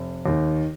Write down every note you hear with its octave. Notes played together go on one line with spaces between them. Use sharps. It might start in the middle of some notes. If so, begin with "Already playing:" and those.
Already playing: F1
D#2 D#3